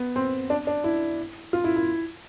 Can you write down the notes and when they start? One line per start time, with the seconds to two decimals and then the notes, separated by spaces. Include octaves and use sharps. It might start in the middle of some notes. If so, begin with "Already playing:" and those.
Already playing: B3
0.16 C4
0.50 D4
0.67 D4
0.84 E4
1.53 F4
1.64 E4
1.76 E4